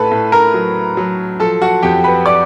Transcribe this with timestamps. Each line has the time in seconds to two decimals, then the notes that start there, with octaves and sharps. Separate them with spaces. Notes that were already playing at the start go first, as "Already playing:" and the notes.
Already playing: A2 A4 B4 A5 B5
0.11 A2
0.32 A#4 A#5
0.54 F#3
0.97 F#3
1.40 F3 A4 A5
1.62 F#4 F#5
1.82 F2 G4 G5
2.04 B4 B5
2.26 D5 D6